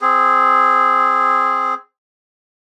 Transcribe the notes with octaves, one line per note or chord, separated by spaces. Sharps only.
C4 G#4